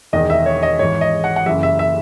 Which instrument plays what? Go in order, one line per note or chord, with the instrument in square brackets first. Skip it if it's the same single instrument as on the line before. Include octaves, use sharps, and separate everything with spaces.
[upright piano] E1 E2 D#3 D#5
E5
C#5
D#5
G#1 G#2 E3 C#5
D#5
F#5
F#5
F#1 F#2 E3 E5
E5
E5